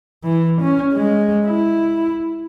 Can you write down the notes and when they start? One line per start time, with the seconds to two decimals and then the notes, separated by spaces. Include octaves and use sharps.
0.24 E3
0.61 C#4
0.94 G#3
1.46 E4